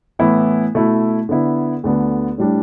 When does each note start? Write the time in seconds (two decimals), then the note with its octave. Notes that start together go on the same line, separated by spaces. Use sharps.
0.19 A2 E3 B3 E4
0.75 B2 A3 E4
1.29 D3 B3 E4
1.84 D2 D3 B3
2.38 A2 G3 D4